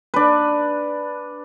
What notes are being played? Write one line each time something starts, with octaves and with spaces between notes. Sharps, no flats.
D4 B4